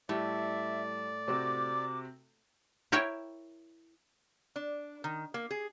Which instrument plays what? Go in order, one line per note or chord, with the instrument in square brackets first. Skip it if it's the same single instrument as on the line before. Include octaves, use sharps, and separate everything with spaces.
[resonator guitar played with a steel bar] A2 [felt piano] G3 [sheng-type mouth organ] D5 [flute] E5
[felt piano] C3 C4 F#4 [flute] D6
[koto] E4 A#4 C#5 G5
[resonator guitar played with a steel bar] D4
D#3
A#3
G#4